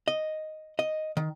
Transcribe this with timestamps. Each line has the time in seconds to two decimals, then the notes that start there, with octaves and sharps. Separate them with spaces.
0.08 D#5
0.79 D#5
1.17 D#3